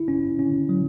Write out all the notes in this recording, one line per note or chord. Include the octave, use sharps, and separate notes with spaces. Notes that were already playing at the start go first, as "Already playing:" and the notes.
Already playing: E4
C#4
C#4
F#3